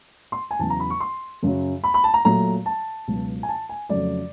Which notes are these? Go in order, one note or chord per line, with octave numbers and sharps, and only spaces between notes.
C6
G#5
E2 C#3 F#3 A5
A#5
B5
C#6
C6
F#2 C#3 F#3
B5
B5
A5
A#5
A#2 F#3 A3 A#5
A5
C#2 B2 F#3
G#5
A5
G#5
F2 C#3 F#3 A3 D5